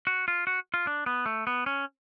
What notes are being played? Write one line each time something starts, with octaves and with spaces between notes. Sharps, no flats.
F#4
F4
F#4
F4
D4
B3
A3
B3
C#4